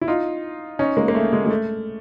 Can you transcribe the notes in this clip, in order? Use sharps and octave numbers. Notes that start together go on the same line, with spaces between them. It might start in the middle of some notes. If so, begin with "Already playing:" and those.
E4
D#4 F4
C#4 D#4
G#3 A#3
A#3
A3
G#3
G#3
A3